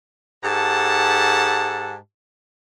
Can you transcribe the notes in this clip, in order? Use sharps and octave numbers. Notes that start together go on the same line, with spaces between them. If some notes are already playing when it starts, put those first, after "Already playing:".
G#2 G4 A4 F#5 A5